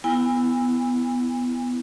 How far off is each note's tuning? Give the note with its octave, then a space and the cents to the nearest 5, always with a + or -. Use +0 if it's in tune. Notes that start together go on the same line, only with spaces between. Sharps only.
B3 +10 E4 +0 G#5 -35